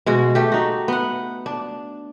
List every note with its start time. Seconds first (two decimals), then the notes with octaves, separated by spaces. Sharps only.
0.06 B2 G#3 F#4
0.35 A3 G4
0.52 D#4 F#4
0.88 B3 F#5
1.46 D4